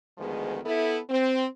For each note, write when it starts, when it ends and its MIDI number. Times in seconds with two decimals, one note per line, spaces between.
0.18 0.59 38
0.18 0.59 51
0.18 0.59 53
0.18 0.59 56
0.18 0.59 59
0.18 0.59 68
0.64 0.98 59
0.64 0.98 64
0.64 0.98 69
1.10 1.44 60